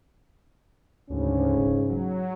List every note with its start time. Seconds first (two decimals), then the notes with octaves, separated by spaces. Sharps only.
1.10 D2 G#2 C#3 C#4
1.57 E1
1.89 F#3